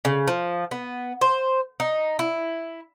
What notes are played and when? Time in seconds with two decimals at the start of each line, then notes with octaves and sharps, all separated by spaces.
0.05 C#3
0.28 F3
0.71 B3
1.21 C5
1.80 D#4
2.19 E4